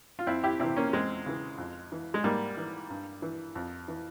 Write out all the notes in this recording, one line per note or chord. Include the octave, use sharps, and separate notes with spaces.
F4
F2 C4 E4
E4 G4
C3 E3 C4 E4
A#3 C#4
E2 G#3 C4
C#3 E3
F2
E3
G#3
G#2 G3 A#3
E3
G2
E3
F2
E3